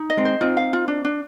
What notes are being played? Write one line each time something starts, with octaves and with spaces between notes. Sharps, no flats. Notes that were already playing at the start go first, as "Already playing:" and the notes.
Already playing: D#4
D#5
G#3 C4
C5
C4 D#4 F4
F5
F4
D4
D4